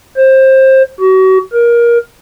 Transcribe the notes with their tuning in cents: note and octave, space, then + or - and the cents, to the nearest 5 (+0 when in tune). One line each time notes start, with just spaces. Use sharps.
C5 +20
F#4 +35
A#4 +20